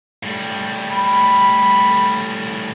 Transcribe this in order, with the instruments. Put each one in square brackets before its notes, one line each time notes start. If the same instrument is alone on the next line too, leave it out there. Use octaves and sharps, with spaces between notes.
[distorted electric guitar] A2 G3
[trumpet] B5